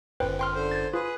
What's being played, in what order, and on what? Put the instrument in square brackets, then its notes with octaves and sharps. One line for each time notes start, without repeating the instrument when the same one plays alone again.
[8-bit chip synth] G1 F#2 [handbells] B4 C5 G5
[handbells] G5 C6 F6
[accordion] D3 C5
[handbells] G#6 A6
[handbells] F4 [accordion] G#4 B4